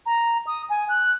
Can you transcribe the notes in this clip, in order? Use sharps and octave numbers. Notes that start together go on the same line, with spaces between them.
A#5
D#6
G#5
F#6